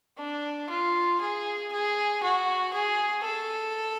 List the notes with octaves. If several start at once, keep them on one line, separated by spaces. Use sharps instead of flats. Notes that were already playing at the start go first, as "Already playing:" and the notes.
D4
F4
G#4
G#4
F#4
G#4
A4